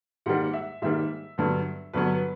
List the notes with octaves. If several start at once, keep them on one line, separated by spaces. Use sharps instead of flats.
G#2 D#3 G3 A#3 F#5
E5
G#2 D#3 G3 A#3 E5
G2 D3 F#3 B3
G2 D3 F#3 B3 B4